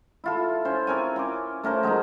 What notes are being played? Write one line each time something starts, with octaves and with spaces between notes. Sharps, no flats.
E4 F4 A4
C#4 C5
C4 A#4 C#5 G#5
C#4 C6 D6
A3 C#4 A#4 C5
F#3 G#3 D#4 A#4